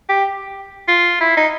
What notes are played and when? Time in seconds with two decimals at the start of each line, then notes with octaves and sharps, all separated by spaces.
0.09 G4
0.88 F4
1.21 E4
1.37 D#4